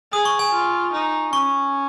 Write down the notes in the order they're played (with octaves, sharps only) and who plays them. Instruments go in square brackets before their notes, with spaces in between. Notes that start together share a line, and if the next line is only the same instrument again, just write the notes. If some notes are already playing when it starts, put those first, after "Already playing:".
[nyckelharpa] G#4 [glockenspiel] D#6
[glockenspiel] C#6
G#5
[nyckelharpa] F4
D#4
[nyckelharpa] C#4 [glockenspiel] C#6